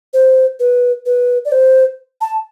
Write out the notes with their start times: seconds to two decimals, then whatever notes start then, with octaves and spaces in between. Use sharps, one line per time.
0.14 C5
0.60 B4
1.06 B4
1.45 D5
1.52 C5
2.21 A5